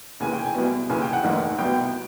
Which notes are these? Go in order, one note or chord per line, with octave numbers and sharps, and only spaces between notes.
D#2 C#3 E3 G#5
G5
G#5
C2 B2
D#2 C#3 E3 G#5
G5
F#5
F1 D#2 D#3
C2 B2 G5